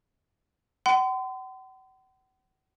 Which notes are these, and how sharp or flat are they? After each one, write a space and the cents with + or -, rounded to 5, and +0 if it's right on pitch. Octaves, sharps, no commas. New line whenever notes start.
F#5 +45 C6 -35